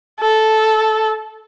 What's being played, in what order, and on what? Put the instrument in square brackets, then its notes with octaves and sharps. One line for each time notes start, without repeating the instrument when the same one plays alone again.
[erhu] A4